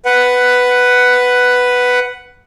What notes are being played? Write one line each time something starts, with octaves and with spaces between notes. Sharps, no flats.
B4 F#5